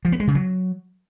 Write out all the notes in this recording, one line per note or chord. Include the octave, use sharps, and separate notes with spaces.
F3
B3
G#3
C#3
F#3